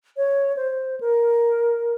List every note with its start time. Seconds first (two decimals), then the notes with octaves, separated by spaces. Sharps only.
0.17 C#5
0.57 C5
1.01 A#4